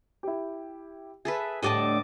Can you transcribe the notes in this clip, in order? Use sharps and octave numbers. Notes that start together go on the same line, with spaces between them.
E4 G4
G#4 A4 B4 E5
D2 A2 G4 D5 D#5 A5 D6 D#7